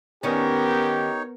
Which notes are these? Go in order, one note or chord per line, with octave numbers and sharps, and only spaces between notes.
D#3 B3 C#4 D#4 G4 A#4 C#5